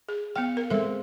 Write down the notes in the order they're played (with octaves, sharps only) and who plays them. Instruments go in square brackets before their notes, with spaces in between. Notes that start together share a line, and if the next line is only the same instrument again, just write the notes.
[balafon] G#4
[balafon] B3 G5 [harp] F5 C#7
[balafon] A#4
[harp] G#3 C4 [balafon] A4 E5